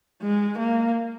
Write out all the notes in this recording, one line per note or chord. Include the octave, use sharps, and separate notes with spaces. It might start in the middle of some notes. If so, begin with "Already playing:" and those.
G#3
A#3